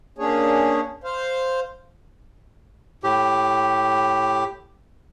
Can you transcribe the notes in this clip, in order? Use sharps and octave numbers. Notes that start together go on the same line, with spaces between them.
A#3 C#4 D4 G#4 C#5
C5 F5
A2 G4